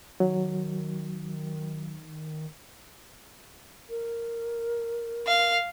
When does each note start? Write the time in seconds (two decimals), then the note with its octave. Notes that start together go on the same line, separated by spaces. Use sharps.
0.20 D#3 F#3
3.89 A#4
5.27 F5